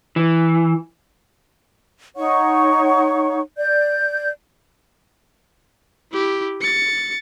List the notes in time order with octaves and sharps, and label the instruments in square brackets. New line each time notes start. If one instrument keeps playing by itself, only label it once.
[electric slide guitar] E3
[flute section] D#4 C#5 F#5 C#6
D5 G6
[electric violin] E4 G4
A6 C#7